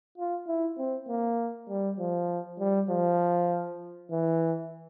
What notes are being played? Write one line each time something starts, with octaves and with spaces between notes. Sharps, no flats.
F4
E4
C4
A#3
G3
F3
G3
F3
E3